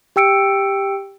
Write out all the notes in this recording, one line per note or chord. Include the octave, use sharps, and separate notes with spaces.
G4 G5 E6 C#7 D7